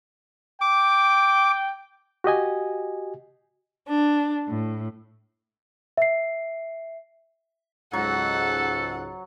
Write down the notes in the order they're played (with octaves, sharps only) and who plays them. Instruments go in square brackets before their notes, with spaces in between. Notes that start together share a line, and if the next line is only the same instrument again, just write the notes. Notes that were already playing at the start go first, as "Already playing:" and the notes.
[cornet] G5 [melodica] D6
[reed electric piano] F#4 G4 D#5 G#5
[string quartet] D4
A2
[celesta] E5 C7
[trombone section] C#2 G#2 [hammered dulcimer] F#3 [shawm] A4 [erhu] F#5